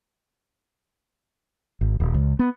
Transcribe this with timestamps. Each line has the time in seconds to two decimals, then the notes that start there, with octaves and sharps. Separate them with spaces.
1.81 G#1
2.00 D#1
2.14 C#2
2.39 B3